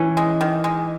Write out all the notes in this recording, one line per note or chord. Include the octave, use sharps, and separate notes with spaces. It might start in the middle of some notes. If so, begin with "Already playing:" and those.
Already playing: E3 C#4
G#3
D#3
G#3